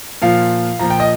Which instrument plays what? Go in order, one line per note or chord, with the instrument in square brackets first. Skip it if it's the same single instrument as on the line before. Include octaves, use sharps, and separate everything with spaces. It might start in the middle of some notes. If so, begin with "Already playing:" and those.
[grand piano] A#2 F3 F5
A#2 F3 A#5
G5
D#5